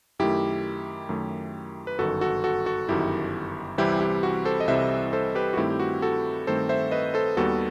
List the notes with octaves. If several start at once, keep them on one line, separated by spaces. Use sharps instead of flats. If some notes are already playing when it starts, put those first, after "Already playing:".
F#2 D#3 A3 E4 G4
F#2 D#3 A3
B4
G1 F#2 D#3 F#4 A4
F#4 A4
F#4 A4
F#4 A4
G1 F#2 D#3 E4 G4
C2 C3 E3 G3 C4 E4 G4
E4 G4
F#4
A4 C5
D#5
C2 C3 E3 G3 C4 C5 E5
A4 C5
G4 B4
F#4
G2 D#3 A3 C4 E4 G4
G4
F#4
F#4 A4
G2 D#3 A3 C4 A4 C5
C5 E5
B4 D#5
A4 C5
D#2 D#3 G3 B3 F#4 A4